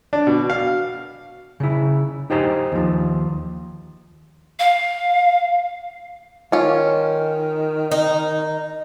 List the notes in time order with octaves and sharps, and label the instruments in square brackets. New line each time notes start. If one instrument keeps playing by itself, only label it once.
[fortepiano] D4
B2
F5
[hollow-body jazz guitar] C#3 E4
D#4 G4 C5 D#5 G#5
D#2 F3
[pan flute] F5
[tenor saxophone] D#3 [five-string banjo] C#4 F4
[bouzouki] D#4